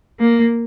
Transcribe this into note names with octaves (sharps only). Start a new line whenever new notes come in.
A#3